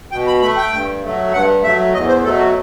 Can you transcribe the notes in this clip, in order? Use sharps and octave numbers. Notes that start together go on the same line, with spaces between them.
B2 G5
B5
A3 B5
G5
G2
F#3 A3
G2 F#5
F#3 A3 E5
E2 D#5
C5
B2 F#3 A3 A4
F#4